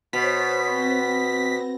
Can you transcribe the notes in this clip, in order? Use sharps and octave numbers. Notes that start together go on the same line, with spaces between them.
B2 C5 C#5 B6
C4 A#6